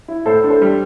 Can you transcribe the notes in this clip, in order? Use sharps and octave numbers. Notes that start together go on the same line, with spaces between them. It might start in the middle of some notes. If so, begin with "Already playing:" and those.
E4
A2 A4 C5
D4
A4 C5
G3